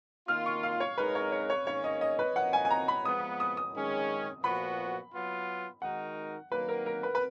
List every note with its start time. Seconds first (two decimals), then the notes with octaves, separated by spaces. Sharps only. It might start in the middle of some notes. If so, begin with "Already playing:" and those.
0.28 D#3 A#3 F4 F6
0.46 C#6
0.63 F5
0.80 C#5
0.97 G#3 D#4 A#4 B4
1.15 C#5
1.32 C#5
1.50 C#5
1.66 G#2 D#3 A#3 C#4 C#5
1.84 D#5
2.01 D#5
2.19 B4
2.35 F3 A#3 D#4 F#5
2.53 G#5
2.65 G#5
2.71 A#5
2.88 B5
3.05 F3 G#3 B3 D#6
3.40 D#6
3.57 D#6
3.74 D#3 G#3 C#4 G#4
4.43 A#2 F3 B3 F#4 B5
5.13 F#3 B3 F4
5.82 D#3 G#3 D#4 F#4 A#4 F#5
6.51 D#3 F#3 A#3 B4
6.68 A#4
6.86 A#4
7.03 B4
7.15 B4